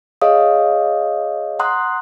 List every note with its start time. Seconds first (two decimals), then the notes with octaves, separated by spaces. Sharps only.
0.21 G#4 C#5 D#5 F5 D#6
1.59 F#5 A#5 C6 D#6 F#6